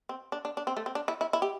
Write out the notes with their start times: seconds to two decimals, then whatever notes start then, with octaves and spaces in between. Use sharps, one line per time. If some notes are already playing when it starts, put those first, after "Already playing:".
0.09 C4
0.32 D4
0.45 D4
0.57 D4
0.67 C4
0.77 A3
0.86 C4
0.95 D4
1.08 E4
1.21 E4
1.33 E4
1.42 G4